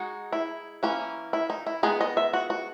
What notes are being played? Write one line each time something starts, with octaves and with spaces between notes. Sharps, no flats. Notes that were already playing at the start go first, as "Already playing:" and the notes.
Already playing: G#3 D#4 F#4
E4
E3 A#3 C#4
E4
D#4
E4
G#3 B3 D#4 G#4
D#5
E5
F#4
F#4